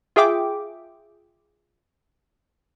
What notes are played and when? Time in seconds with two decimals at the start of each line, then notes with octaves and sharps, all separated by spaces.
0.16 F4 G#4 E5 G5 D6